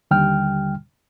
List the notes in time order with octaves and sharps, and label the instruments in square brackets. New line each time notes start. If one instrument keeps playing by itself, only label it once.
[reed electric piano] D#2 D3 G3 G5 F6